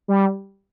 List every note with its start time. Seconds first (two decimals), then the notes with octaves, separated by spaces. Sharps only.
0.08 G3